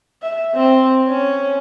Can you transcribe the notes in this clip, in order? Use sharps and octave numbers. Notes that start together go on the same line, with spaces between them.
E5
C4
C#4